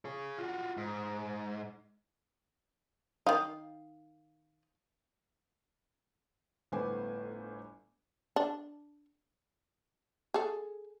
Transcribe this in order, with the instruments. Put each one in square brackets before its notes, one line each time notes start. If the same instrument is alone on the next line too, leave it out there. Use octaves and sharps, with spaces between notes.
[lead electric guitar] G#4 C#5
F4 F#4
G#2
[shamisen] D#3 D#4 [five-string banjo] F5
[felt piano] G1 A2 B3 C5 G#5 D6
[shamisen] D4
G#4 A4